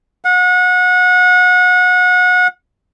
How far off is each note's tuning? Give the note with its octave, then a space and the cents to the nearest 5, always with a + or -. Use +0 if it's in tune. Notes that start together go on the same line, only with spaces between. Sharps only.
F#5 -30